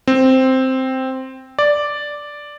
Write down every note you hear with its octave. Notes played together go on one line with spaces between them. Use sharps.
C4
D5